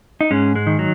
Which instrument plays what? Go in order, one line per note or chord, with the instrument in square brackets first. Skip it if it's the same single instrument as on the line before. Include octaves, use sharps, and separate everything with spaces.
[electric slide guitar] D#4
G#2 G#3 C#4
G#3
D#3
F#3